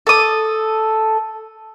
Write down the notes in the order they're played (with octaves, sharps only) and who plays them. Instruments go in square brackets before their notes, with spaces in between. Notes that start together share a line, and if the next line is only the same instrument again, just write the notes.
[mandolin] A4 D#6